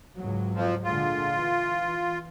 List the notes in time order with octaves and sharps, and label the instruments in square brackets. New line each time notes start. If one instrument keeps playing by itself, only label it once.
[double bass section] C#2 G#2 F#3
[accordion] F2 F3
[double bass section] A#2 D3 G#3 [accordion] F4
[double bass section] E3